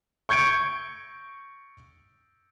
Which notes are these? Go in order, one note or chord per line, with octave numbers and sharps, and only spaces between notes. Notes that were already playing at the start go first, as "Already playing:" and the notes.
C#6 G6 G#6 C#7 D7